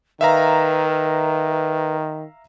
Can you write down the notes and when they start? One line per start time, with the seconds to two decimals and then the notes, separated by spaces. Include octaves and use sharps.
0.21 D#3 B4 E5 F5 A#5